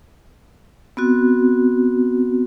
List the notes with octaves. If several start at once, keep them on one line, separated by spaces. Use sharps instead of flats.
B3 C4 F#4